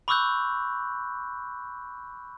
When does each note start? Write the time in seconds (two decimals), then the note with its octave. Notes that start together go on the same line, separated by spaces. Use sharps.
0.08 B5 C#6 D6 E6 F#6 G6